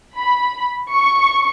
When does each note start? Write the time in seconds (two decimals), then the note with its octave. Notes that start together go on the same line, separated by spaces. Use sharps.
0.17 B5
0.93 C#6